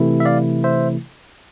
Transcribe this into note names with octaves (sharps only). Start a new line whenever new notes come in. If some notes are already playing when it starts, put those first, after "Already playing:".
Already playing: C3 E3 A3 E4
E5
D5 F5
C5 E5